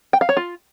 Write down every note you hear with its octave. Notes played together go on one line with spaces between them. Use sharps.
G5
F5
C#5
F4